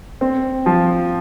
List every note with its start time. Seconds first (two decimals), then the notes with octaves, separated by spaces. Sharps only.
0.21 C4
0.66 F3